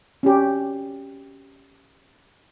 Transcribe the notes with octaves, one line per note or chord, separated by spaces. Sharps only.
C#4 F#4 G4